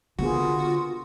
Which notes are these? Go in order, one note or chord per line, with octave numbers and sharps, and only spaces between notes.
D3 A#3 B3 F4 F#4 G#4